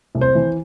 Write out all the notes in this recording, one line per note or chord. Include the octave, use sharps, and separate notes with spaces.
C2
C5
E3